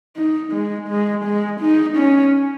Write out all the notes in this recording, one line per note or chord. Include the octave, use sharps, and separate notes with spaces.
D#4
G#3
G#3
G#3
D#4
C#4